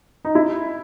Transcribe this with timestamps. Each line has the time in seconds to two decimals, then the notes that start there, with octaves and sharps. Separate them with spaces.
0.25 D#4
0.35 E4